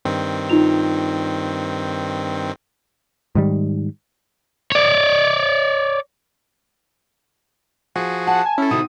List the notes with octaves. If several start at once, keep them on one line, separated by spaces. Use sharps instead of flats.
G2 D#3 C4
D#4 F4 F7
G#2 D#3 G3
C#5 D5
F3 F#4 G#4 F#5
F#5 A5
G#5
C#4 E4 A4
C3 D#3 F#4 D#6